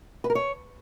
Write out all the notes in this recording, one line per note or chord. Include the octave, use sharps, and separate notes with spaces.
B4
A#4
C#5